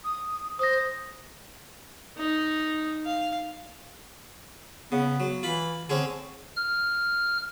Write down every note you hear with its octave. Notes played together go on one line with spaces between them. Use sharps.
D#6
C5 D#6 A#6
D#4
F5
C#3 B3
F#3
E3 F4 B5
D3 C4 C#4 G#4
F6